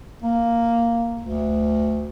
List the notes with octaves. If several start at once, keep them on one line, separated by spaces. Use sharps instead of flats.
A#3
D2